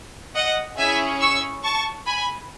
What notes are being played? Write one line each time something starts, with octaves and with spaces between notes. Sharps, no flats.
D#5 F#5
C#4 E4 G#4 E5 G#5
C#6 E6
A5 C#6
G#5 B5